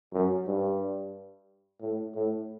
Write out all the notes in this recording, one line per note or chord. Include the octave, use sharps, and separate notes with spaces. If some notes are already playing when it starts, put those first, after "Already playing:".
F#2
G2
A2
A2